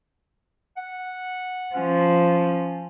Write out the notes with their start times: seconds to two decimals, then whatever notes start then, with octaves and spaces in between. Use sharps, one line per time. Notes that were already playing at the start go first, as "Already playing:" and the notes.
0.77 F#5
1.75 F3 C#4